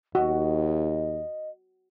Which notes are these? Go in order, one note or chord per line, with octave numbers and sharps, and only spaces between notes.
D#2 F#4 D#5